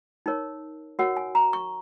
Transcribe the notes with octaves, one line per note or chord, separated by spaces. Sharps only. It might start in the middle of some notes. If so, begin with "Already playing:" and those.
D#4 A#4 C#5
F#4 A#4 C#5 F#5
G#5
A#5
C#6